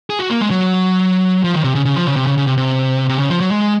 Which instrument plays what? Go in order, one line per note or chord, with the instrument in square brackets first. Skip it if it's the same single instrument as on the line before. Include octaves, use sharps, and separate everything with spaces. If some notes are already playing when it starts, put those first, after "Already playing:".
[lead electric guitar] G#4
F#4
A#3
G#3
F#3
F3
D#3
C3
C#3
C#3
F3
C#3
C3
C#3
C#3
C3
C3
C3
C#3
F3
F#3
G#3